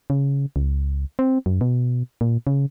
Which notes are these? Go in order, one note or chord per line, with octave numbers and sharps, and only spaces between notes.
C#3
C#2
C4
F#2
B2
A#2
C#3